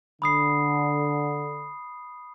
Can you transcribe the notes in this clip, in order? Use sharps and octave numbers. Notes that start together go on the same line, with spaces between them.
D3 B5 D#6 C7